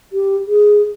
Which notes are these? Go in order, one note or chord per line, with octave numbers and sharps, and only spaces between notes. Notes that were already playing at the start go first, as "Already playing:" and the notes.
G4
G#4